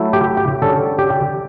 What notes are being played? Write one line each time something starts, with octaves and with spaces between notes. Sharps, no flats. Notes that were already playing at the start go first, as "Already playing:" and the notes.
Already playing: F#3 A3 E4
G4
G4
D3 G3 C#4 A4
G4